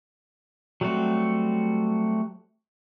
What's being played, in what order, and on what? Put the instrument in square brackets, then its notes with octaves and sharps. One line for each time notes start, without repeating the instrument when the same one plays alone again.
[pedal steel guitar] F#3 G3 A3 C4 F#4